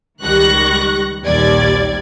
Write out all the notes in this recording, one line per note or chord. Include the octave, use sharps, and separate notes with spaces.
C#2 D#3 G3 C#6 F#6 A#6
A#1 D#2 G3 D5 G#6